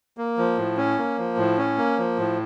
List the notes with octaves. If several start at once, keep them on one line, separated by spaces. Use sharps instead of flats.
A#3
F3
A2
C#4
A#3
F3
A2
C#4
A#3
F3
A2